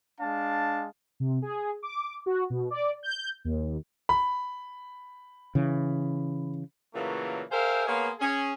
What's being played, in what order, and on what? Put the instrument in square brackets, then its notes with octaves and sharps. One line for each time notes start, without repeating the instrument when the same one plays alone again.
[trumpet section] G#3 D4 F5 A5
[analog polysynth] C3
G#4
D6
F#4
B2
D5
G6
D#2
[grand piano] B5
[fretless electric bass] C#3 E3
[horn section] A#2 C#3 E3 F#3 A3 A#3
G#4 A#4 C5 E5 F5 G5
A#3 B3 G#4 C#5 F5 C6
C#4 G#4